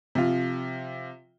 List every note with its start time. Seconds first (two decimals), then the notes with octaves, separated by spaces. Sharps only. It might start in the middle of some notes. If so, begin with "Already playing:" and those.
0.15 C3 F3 F4